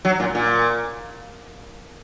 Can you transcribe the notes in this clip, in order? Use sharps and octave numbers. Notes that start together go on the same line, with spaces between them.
F#3
A#2
A#2